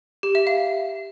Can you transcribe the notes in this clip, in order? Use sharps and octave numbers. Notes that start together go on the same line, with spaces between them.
G4
E5
F5